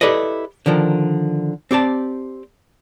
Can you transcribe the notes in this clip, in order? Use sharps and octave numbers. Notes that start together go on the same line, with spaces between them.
E4 G4 A4 B4 D5 D#5
D3 D#3 F3 A#4
C4 G4 D5 A5